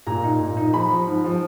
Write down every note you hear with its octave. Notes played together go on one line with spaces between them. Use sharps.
A#2 A#5
D#4
A#2
D#4
F3 B5
F3
G#2
F3